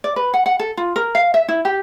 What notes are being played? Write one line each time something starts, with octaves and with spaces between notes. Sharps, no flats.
D5
B4
F#5
F#5
A4
F4
A#4
F5
E5
E4
G4